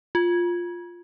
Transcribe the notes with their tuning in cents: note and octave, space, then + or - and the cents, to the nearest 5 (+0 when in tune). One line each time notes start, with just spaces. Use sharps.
F4 +5